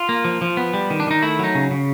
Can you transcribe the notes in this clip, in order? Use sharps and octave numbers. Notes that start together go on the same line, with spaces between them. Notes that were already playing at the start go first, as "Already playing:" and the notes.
Already playing: F4
A#3
F3
F3
B3
G3
D#3
D4
D#3 D#4
A3 E4
F#3 D#4
C#3
C#3